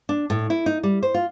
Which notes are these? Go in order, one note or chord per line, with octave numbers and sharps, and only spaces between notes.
D4
A2
E4
D#4
G3
C5
F4